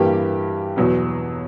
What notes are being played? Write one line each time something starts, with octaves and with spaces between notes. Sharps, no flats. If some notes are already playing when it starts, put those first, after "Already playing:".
Already playing: G2 E3 G3 A#3 G4
E2 B2 F#3 B3